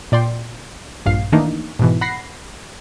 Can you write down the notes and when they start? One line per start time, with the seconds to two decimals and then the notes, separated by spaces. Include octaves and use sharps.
0.12 A#2 D5 G5 C6
1.06 A#1 G2 A#2 F5 C7
1.32 D#3 E3 A3 A#3 D4 D#4
1.79 G#2 B2 E3
2.01 F#5 B5 A#6 C7